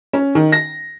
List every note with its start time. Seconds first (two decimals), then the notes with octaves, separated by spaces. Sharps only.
0.13 C#4
0.35 D#3
0.52 A#6